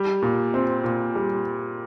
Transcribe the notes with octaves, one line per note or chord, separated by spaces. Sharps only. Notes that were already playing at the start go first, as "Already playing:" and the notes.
Already playing: G3
A#2
C4
A#2
G3